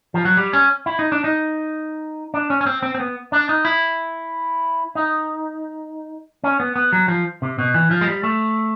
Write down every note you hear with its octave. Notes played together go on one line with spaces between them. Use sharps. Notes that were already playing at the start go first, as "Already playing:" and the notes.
F3
F#3
G3
C#4
E4
D#4
D4
D#4
D4
C#4
C#4
C4
C4
C4
B3
D4
D#4
E4
D#4
C#4
B3
B3
F#3
F3
C3
B2
E3
F3
G#3
G3
A3